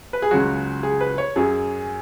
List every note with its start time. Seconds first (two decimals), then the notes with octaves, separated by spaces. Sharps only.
0.13 B4
0.22 G#4
0.31 C#2 C#3 F#3 F#4
0.83 G#4
1.01 B4
1.18 C#5
1.36 F#2 F#3 G#4